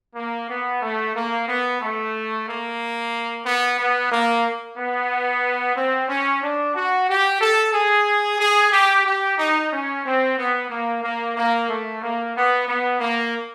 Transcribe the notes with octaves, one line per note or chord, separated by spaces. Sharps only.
A#3
B3
A3
A#3
B3
A3
A#3
B3
B3
A#3
B3
C4
C#4
D4
F#4
G4
A4
G#4
G#4
G4
G4
D#4
C#4
C4
B3
A#3
A#3
A#3
A3
A#3
B3
B3
A#3